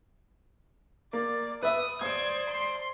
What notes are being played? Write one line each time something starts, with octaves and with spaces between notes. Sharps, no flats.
A#3 D5
B4 E5 D#6
C5 D5 D#6 G#6
C6